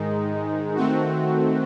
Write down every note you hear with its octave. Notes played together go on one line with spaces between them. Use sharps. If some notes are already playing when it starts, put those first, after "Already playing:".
Already playing: G#2 D#3 G#3 D#4
D#3 A3 C4 F#4